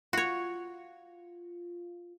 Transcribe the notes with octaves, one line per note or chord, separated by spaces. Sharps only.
F4 F#4 C#5